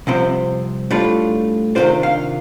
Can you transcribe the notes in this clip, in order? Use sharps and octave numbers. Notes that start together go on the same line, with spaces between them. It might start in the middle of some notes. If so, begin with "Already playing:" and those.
C2 C3 F3 C4
A2 G3 D4 F4
C3 D#3 G3 D4 F4 C5
F5